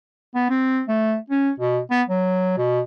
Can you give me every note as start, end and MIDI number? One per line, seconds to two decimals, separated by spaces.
0.35 0.49 59
0.50 0.82 60
0.89 1.17 57
1.30 1.51 61
1.60 1.79 47
1.91 2.02 59
2.09 2.56 54
2.58 2.80 47